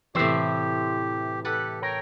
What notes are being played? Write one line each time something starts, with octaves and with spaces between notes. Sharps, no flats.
A2 C3 E3 E4 G4 C5 E5
G4 A4 B4 F#5
A#4 C#5 G5